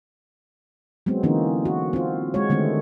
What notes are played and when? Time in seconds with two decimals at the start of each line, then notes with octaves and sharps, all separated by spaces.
1.06 F#3 G#3 B3 C4
1.23 D3 E3 A#3 C4 C#4 D#4
1.65 F#4
1.93 C4 F4
2.34 G#3 F#4 C#5
2.50 D3 D#3 G#3 A3 C4